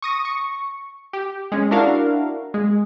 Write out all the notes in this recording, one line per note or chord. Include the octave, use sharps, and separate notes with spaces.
C#6 D#6 A#6
C#6
G4
G#3 C#4
D4 E4 F#4 A#4 F5
G#3